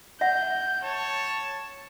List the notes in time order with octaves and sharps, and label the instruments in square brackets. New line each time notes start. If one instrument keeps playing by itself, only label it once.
[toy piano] E5 F#5 [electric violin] G6
[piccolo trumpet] C#5 [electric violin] A5